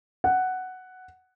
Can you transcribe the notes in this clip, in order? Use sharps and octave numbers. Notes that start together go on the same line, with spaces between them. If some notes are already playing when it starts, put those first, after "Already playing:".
F#5